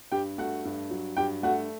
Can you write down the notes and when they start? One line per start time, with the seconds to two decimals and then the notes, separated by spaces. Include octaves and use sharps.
0.12 G2 G4 G5
0.38 A3 F#4 F#5
0.65 G2
0.91 F#3
1.17 G2 G4 G5
1.43 A3 F#4 F#5